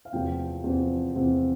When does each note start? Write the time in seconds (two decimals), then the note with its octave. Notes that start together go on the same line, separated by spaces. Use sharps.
0.05 F5
0.13 E2 C3 F3 C4 G5
0.64 E2 C3 F3 C4
1.15 E2 C3 F3 C4